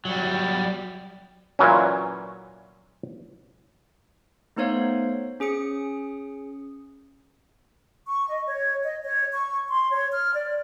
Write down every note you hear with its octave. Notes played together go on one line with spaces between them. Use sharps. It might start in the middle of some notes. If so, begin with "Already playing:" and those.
F#3 G3
A#2 E3 F#3 C#4
A3 B3 D#4 C5 C#5 F5
C#4 G#4 D#6 C#7
C#6
D#5
C#5
D#5
C#5
C#6
C6
C#5
F6
D5